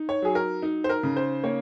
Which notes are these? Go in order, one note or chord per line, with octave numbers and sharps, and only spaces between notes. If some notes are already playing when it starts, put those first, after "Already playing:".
Already playing: D#4
C#5
F#3 G#4
A#4
D#4
C5
A#4
C#3
C5
A#3 C#5